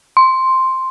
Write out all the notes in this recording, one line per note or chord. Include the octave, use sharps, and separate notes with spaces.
C6